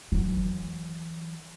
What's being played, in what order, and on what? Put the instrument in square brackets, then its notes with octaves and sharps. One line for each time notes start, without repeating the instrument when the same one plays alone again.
[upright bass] E3 F#3